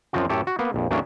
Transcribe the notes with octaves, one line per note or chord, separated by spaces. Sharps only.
F#2 F3 C4 F4 F#4
F#2 A2 G4 A4 C#5
F#4
A#3 B3
A#1 F2
E2 A2 F#3 A#3 C#4 D4